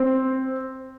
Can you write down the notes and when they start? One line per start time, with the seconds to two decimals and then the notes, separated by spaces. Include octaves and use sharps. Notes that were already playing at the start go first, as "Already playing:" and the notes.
Already playing: C4